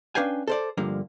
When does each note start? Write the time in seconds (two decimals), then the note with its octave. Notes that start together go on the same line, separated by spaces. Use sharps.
0.15 C#4 D4 B4 F5 G5 G#5
0.48 A4 C5 D5
0.77 G2 D3 F3 A#3